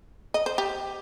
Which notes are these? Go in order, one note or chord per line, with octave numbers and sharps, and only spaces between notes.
D#5
C5
G4